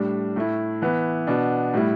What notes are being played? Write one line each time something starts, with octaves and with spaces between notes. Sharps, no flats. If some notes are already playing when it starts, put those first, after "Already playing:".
Already playing: A2 G3 D4
A2 A3 E4
E3 B3 E4
B2 B3 D4
A2 G3 E4